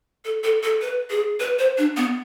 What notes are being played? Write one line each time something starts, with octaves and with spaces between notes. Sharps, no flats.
A4
A4
A4
B4
G#4
B4
C5
D4
B3